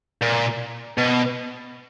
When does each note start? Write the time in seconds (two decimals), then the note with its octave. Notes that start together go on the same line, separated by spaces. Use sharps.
0.22 A#2
0.98 B2